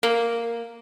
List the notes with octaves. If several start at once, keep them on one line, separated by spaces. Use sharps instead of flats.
A#3